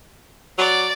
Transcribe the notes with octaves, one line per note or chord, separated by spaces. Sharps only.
F#3 D5